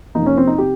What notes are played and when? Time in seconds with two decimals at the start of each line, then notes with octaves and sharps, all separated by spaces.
0.15 F2 C3 F3 A#3 D#4
0.26 C#4
0.37 C4
0.47 D#4
0.58 C3 G4